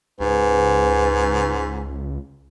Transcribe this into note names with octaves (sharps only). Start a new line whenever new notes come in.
C#2 G#2 B4